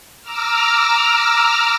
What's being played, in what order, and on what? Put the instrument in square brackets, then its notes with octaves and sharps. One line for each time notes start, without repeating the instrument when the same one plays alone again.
[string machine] A#5 D6 E6 F6